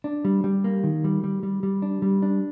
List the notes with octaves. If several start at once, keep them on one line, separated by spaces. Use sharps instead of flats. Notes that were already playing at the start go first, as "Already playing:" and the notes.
D4
G3
G3
A#3
D#3
G3
G3
G3
G3
D4
G3
D4